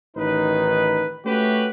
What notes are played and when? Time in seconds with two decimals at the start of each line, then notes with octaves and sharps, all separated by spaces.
0.16 A1 D#3 D#4 B4
1.26 A3 C#4 F#4 G4 B4